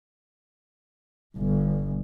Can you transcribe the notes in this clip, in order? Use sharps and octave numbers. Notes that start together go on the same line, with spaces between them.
G1